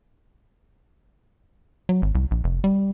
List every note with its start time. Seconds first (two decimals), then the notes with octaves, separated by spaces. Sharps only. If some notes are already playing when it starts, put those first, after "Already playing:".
1.89 F#3
2.02 G#1
2.15 C2
2.31 A#1
2.44 F1
2.64 G3